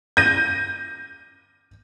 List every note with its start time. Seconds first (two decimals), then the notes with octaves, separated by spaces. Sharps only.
0.17 G6 A#6 D#7